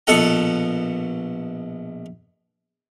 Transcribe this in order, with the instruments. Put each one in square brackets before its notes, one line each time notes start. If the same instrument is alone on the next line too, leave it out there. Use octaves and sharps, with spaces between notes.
[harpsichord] A#1 B2 A4 F#5 A#5